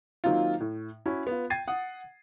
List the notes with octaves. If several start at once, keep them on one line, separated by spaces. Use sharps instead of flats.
D#3 F#3 A#3 C4 D#4 F4
A2
C#4 E4 F#4
B3 F4
G5 G#6 A6 C7 D#7
F#5 D#6